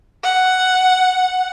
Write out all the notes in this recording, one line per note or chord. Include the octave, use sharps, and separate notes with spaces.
F#5